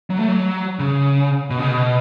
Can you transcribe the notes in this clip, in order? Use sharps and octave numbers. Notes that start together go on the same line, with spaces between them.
F#3
A3
F#3
C#3
B2
C#3
B2